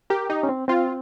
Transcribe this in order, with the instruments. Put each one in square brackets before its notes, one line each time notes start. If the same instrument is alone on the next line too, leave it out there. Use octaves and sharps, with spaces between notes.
[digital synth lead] G4 [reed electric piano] A#4
[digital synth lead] D#4 [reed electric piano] G4
[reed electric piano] C#4
C4
[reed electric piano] C4 [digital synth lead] F4